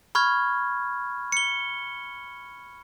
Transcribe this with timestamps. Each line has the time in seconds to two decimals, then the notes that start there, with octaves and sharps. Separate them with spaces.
0.15 B5 C#6 F6 G#6
1.32 C#7 G7